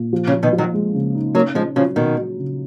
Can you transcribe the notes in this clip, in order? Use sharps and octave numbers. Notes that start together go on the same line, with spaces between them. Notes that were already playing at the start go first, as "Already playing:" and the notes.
Already playing: A#2
F3
C#3
F3
B2 D#3
F3
D#3 F#3
G#3
C#3
D#4
F#3 A#3 C#4
F3 G#3 C#4
C#3 F3 F#3
B2 D#3 F#3
F#3
C#3